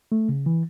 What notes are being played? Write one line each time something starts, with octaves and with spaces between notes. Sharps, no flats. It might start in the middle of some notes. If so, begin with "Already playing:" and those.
A3
C#3
E3